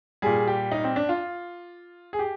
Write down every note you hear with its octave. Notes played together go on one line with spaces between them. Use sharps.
A#2 G3 G#4
G4
D#4
C4
D4
F4
G#4
G4